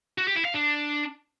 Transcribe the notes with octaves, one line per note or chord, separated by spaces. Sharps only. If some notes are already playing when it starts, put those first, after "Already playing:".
F#4
G4
E4
F5
D4